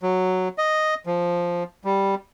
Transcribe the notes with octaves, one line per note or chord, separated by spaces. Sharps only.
F#3
D#5
F3
G3